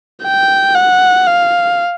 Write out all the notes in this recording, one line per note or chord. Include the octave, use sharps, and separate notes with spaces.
G5
F#5
F5